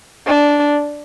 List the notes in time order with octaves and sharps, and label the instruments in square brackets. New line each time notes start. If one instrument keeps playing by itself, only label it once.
[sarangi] D4